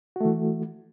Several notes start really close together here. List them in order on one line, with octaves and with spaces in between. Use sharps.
F#4 A3 E3